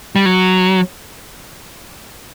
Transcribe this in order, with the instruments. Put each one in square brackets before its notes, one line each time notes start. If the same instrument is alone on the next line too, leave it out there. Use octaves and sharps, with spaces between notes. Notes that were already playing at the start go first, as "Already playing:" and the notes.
[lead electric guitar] G3
F#3